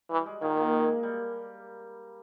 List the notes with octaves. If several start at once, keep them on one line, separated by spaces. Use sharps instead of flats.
E3 G3
G#3
A#2 D#3 A#3
A#2 A#3
G#3
G#3
G3